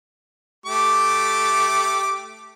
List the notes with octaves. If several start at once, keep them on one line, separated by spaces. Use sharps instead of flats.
A3 G4 D6